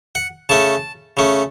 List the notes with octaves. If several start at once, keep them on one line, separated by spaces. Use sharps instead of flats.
F#5
C#3 A3 C#4 A5
C#3 A3 C#4